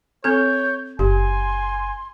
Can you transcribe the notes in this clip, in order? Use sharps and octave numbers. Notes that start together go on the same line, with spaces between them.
C4 A4 C#5 G6
F#1 G4 G#5 C6